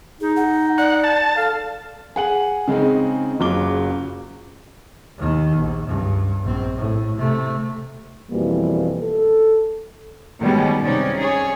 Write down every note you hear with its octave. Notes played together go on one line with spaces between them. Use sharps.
D#4 G#4
F#5
D5 F#5
A5
A4 F5
G#4 F#5 F#7
C#3 G#3 C4 C#4 D#4
F#1 C#3 F#3 F4 D6 G7
D#2 D#3
A#1
C#2 G2
A#1 C4
A2
C3 A3
F2 B2 E3 G3 A#3
A4
B2 D#3 G3 G#3 B3 C#4
C3 C#4 D#4 D5
G#4 C#5